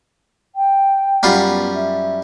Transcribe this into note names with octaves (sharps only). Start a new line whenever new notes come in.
G5
F#2 G3 F4
B3
E5